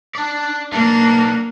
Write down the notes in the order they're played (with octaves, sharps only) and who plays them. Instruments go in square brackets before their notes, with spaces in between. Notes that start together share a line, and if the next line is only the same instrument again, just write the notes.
[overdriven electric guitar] D4 D5
[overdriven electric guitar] B1 D4 [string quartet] A#3